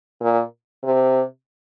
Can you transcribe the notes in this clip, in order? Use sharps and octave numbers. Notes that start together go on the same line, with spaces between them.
A#2
C3